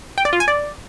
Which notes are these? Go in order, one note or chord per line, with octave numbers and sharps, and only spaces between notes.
G5
D5
F4
G#5
D5